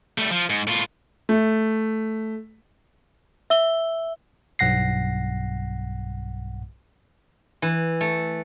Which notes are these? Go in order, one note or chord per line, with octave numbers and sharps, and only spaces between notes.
G3 A3
F3
G#2
A2 F4
A3
E5 E6 G7
B1 G2 F#5 A#6 C7
E3
A3